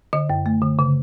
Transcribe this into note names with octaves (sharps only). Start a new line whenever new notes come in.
D3 D#5
F#2
A3
D3
C#3